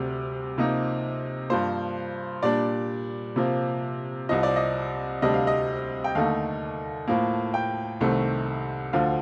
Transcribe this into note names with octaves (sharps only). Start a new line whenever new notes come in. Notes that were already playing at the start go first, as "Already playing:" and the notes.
Already playing: D2 C3 G3 C4
C3 F3 A#3 D#4
G2 F3 A#3 C5
A#2 G3 D4 D5
C3 F3 A#3
C2 C3 F3 D#5
D5
D#5
D2 C3 G3 D4 D#5
F5
D#5
G5
D#2 D3 A3 D#4 F5
A2 F3 A#3
G5
C2 C3 D#3 A3 C4
D2 D3 F3 F5